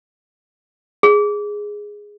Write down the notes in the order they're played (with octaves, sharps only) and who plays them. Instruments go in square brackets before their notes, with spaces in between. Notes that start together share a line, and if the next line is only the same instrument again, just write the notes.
[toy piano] G#4